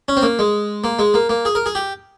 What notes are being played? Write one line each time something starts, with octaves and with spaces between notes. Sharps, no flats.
C#4
C4
A#3
G#3
A#3
G#3
A#3
A#3
G#4
A#4
G#4
G4